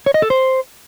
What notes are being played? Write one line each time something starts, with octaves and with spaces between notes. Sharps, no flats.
C#5
D#5
A4
C5